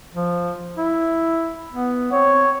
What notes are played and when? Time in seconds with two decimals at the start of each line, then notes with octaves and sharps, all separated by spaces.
0.15 F3
0.78 E4
1.72 B3
2.13 C4 C#5